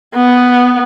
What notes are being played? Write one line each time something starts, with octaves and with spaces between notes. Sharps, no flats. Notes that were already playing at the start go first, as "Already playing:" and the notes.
B3